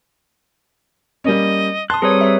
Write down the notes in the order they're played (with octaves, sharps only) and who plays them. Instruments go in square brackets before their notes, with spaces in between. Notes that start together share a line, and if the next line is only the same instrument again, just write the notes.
[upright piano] G3 A#3 C#4 [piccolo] D#5
[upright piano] A5 [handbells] C6 D#6 [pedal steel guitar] F#6
[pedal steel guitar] G3 C4 A#4 [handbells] G#4 B4 C#5 [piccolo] D#6
[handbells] C#5 E5